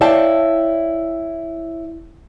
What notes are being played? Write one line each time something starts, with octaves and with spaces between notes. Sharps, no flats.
E4 C#5 D5 F5 G5 A5